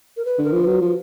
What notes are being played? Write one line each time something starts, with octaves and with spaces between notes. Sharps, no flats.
A#4
B4
D3
A#4
F3
B4
F#3
F3